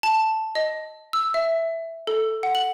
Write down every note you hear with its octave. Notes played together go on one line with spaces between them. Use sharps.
A5
D#5
E6
E5
A4
F#5
F#7